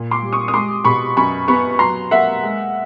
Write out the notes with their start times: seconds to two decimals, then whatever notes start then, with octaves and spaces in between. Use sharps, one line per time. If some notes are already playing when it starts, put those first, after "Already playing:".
Already playing: A#2
0.11 C6 D6
0.22 G3
0.33 C#6 D#6
0.48 D#6
0.53 G#3 C6 D6
0.85 B2 B5 C#6
1.17 F#2 B5 C#6
1.48 B3 B5 C#6
1.79 F#3 A#5 C6
2.11 A#3 E5 F#5
2.43 G#3